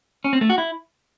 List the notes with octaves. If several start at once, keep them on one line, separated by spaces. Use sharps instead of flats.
C#4
C4
A3
F#4
E4